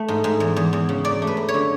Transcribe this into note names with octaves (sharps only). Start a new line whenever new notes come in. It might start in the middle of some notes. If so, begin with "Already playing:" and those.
Already playing: A3
G#2
G#2
E2
E2
E2
C#3
F#2 D5
A3
B4
F#2
C#5
D3